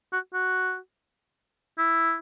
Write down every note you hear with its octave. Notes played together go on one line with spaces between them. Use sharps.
F#4
F#4
E4